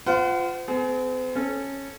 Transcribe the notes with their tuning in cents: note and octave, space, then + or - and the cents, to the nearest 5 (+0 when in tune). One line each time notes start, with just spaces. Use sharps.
F4 +0 C5 -40 F#5 +25
C4 -40 G#4 +35
C#4 -15 A4 -10